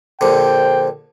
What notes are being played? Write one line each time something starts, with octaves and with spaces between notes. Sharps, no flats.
A#1 D3 C5 G5